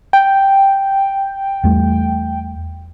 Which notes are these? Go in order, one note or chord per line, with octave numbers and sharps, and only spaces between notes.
G5
E2 G3 A3